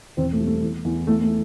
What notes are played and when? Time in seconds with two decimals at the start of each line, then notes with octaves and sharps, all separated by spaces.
0.17 E1 C4
0.33 A3
0.40 G3
0.47 A3
0.63 E2
0.85 E2
1.07 E2 A3
1.22 A3